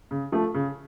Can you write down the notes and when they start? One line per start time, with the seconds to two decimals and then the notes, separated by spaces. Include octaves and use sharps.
0.11 C#3
0.32 F3 A3
0.54 C#3